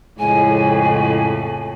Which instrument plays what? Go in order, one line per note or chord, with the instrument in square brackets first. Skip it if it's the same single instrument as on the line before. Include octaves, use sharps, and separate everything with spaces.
[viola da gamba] F2 A2 C#3 [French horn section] G#3 E4 [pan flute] G#5